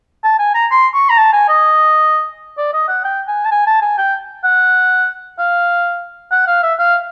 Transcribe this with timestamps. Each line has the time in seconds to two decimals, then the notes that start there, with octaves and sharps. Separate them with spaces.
0.24 A5
0.39 G#5
0.55 A#5
0.71 C6
0.94 C#6
1.10 A#5
1.18 A5
1.33 G#5
1.49 D#5
2.58 D5
2.73 D#5
2.88 F#5
3.04 G5
3.28 G#5
3.45 A5
3.51 G#5
3.67 A5
3.82 G#5
3.98 G5
4.44 F#5
5.39 F5
6.32 F#5
6.47 F5
6.63 E5
6.79 F5